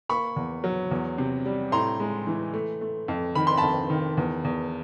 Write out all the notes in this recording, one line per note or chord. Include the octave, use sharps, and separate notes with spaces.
A#3 B5 C#6
E2
F#3
E2
C3
G3
A2 A#5 C6
G#3
E3
A3
A3
F2
D#3 B5
C6
F2 A5 B5
D#3
E2
E2